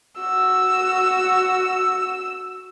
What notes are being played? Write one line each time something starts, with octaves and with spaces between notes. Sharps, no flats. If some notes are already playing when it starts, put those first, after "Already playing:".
F#4 E6